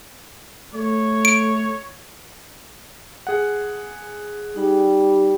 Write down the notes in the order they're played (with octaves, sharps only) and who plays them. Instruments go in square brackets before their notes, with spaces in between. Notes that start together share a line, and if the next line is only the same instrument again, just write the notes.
[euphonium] A3 [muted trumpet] C#5
[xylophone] D7
[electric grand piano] G#4 F#5
[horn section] G3 [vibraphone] D#4